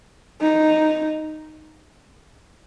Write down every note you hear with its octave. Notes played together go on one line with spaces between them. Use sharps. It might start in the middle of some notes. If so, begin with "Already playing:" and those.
D#4